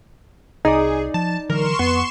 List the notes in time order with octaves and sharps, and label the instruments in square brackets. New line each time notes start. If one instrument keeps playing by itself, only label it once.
[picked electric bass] C2 [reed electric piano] D#4 D5 [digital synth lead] G#4
[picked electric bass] F3 [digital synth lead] A5
[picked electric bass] D3 E3 F#3 [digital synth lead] A#4 [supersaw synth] C6 C#6 E7
[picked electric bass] F2 [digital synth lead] B3